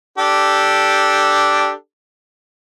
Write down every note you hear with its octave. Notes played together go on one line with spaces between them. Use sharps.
D4 G4 A4